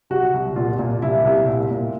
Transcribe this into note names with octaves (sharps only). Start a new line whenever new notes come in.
C2 F#4
C2
A#2 F4
A#2
C2 E4
C2
A#2
A#2